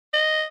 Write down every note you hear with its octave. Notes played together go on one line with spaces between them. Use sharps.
D#5